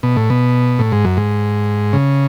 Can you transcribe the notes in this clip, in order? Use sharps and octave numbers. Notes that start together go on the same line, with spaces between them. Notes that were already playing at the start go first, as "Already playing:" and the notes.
B2
A2
B2
A2
G#2
F#2
G#2
C#3